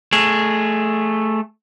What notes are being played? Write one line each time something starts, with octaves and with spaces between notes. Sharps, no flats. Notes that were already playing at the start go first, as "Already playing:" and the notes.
A3 G#4